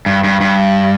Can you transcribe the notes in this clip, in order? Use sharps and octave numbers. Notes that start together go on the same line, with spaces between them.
G2
G2
G2